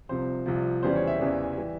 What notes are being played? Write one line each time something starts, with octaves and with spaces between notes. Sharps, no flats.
C2 C3 F3 C5
C2 C3 F3
E2 C#3 E3 G3 C5
C#5
E5
E2 C#3 E3 G3
E3 G3